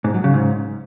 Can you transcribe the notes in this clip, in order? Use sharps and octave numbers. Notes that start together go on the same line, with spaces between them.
G#2
F#3
C#3
G#2